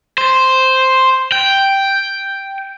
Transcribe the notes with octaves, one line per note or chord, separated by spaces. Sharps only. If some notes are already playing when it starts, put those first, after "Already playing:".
C5
G5